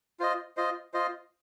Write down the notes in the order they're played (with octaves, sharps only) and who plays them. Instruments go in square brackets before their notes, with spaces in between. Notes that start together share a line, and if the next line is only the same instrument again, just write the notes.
[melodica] F4 C5 D#5
F4 C5 D#5
F4 C5 D#5